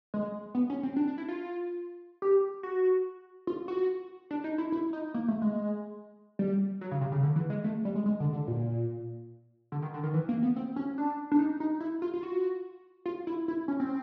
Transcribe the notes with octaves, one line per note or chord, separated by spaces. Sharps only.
G#3
B3
C#4
C4
D4
D4
E4
F4
G4
F#4
F4
F#4
D4
D#4
E4
E4
D#4
A#3
A3
G#3
G3
F#3
C#3
C3
C#3
D3
E3
G#3
A3
G3
G#3
G#3
D3
D3
A#2
D3
D#3
D3
D#3
E3
A#3
B3
C4
C#4
D4
D4
D#4
D#4
E4
F4
F4
F#4
F4
E4
E4
C#4
C4